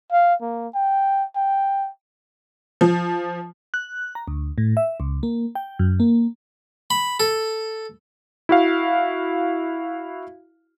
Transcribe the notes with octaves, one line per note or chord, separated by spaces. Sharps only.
F5
A#3
G5
G5
F3
F#6
A#5
D2
A2
E5
C#2
A#3
G5
F#2
A#3
B5
A4
E4 F#4 F5